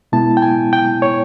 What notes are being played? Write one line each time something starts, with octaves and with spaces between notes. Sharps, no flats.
B2 G#3 B3 E4 A5
G5
G#5
G5
C#5